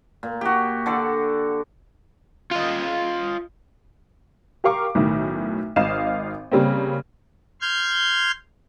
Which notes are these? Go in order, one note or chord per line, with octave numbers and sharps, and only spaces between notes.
A#2
F#4 G4
D3 A4 D5
F4 D#5
G4 A#4 F5 C#6 D6
B1 A2 D#3
G#1 D#5 F5 E7
C#3 G3 A#3 C4
C6 F6 G6 G#6